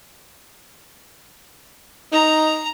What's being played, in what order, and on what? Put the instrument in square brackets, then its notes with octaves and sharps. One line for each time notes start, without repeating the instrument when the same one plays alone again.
[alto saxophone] D#4 [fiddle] A#5